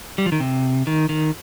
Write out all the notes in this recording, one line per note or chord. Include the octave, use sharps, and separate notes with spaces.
G3
F3
D#3
C3
D#3
D#3